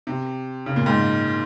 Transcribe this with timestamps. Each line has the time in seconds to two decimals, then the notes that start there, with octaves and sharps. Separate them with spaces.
0.07 C3
0.66 C#3
0.76 A#2
0.86 G#2